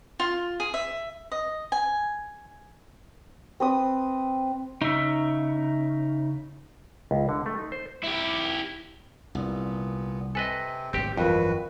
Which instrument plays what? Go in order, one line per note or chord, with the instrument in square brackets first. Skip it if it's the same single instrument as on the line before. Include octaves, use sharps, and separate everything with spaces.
[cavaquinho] F4
G#4
E5
D#5
G#5
[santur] C4 B4 D#6
[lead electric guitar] C#3 [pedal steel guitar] D#4 E5
[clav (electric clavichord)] C#2
D3
A3
D#4
C5
[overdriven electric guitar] E4 G4
[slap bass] C2 [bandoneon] A#2 B3
[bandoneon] C3 C4 [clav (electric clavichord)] A4 B4 D#5 [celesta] G#5
[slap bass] D1 G#1 B2 [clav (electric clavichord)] C4 G4
[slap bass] G1 E3 F#3 [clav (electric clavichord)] F2 [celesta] F4 A#4 [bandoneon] F#4 B4